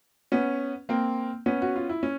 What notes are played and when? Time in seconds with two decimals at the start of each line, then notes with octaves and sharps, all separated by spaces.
0.32 B3 C#4
0.89 A#3 C4
1.46 B3 C#4
1.62 F#4
1.76 F4
1.89 E4
2.03 C#4